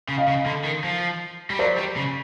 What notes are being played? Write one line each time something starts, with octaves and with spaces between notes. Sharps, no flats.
C#3
D#5 F5
C#3
D3
D#3
F3
G3
F#3 C5 D5
G3
C#3